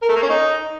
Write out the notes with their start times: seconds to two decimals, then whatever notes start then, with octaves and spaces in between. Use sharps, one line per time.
0.02 A#4
0.09 A3
0.16 A#3
0.23 C#4
0.29 D#4